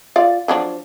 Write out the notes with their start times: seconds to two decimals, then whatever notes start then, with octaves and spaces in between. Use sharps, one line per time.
0.16 F4 D5 F5
0.48 F3 F#3 D4